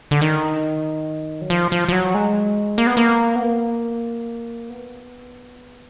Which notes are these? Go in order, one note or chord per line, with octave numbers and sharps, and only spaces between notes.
D3
D#3
F#3
F3
F3
F3
F#3
G#3
A#3
B3
A#3
B3
A#3
B3